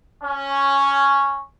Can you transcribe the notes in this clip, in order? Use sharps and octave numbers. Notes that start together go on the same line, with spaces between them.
C#4